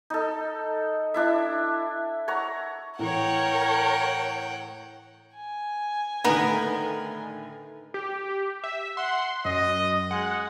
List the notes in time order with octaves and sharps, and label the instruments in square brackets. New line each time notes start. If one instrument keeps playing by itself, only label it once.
[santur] D#4 A4
D4 E4 E5
C#5 F#5 A#5 C#6
[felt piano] A2 E3 [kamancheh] A#4 C#5 [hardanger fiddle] F#5 G5
[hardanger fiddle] G#5
[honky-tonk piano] A2 D3 D#3 [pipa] B3 D#4 [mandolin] A#4 B4
[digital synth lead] G4
E5
[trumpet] F#5 [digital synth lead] C6
[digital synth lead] F#2 [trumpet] D#5
[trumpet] G#3 [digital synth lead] F#5